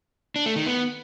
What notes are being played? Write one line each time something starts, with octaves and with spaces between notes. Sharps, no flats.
D4
A3
D#3
B3